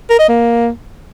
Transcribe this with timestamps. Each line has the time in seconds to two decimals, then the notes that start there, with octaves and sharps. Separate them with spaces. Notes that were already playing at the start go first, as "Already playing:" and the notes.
0.10 A#4
0.19 D#5
0.29 A#3